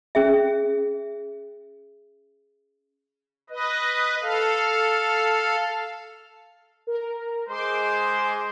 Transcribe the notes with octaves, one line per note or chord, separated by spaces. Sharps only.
C#4 G#4 E5
B4 D#5
A4 F5
A#4
G#3 G#4 C5 C6 D6